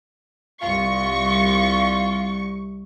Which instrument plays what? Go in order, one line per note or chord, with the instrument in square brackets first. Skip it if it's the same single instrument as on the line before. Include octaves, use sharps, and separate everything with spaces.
[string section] C2 C#6 [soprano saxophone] F4